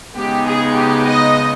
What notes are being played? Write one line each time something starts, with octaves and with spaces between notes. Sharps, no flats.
C#3 G#3 B3 D#4 G4
G#4
G4
D#5